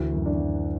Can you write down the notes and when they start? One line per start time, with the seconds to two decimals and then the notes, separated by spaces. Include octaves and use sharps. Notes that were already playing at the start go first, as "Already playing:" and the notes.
Already playing: D2 E3 F#4
0.13 F#2
0.26 D4
0.38 F#2